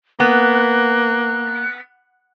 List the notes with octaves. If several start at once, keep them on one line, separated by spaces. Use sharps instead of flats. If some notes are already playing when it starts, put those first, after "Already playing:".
A#3 B3 F#6